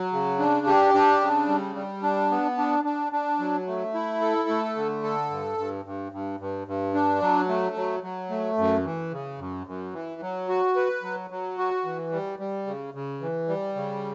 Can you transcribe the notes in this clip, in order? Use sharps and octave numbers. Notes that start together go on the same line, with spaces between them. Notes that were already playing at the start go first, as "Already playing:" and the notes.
Already playing: F#3
C#3
D4
G4
D4
C#3
G3
G3
D4
B3
D4
D4
D4
F#3
A3
E4
A4
A3
D3
A4
G2
G2
G2
G2
G2
G2
D4
F#3
A3
F#3
F#3
A3
F#2
E3
C#3
F#2
F#2
E3
F#3
F#4
B4
F#3
F#3
F#4
E3
G3
G3
C#3
C#3
E3
G3
C#3